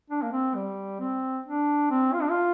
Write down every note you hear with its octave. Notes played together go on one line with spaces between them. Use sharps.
D4
A#3
C4
G3
C4
D4
C4
F4
D4
F4